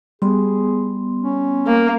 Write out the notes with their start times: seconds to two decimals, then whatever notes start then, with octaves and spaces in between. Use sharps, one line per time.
0.22 G3 B3 G#4 C6
1.23 C#4
1.67 A#3